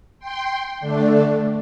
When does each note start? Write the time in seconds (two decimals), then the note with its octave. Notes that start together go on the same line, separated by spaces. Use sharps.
0.19 G5 C6
0.80 D3 A3 D4